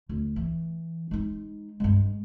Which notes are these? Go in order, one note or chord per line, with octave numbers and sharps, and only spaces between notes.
D2
E3
G#3 D#4
G2 G#3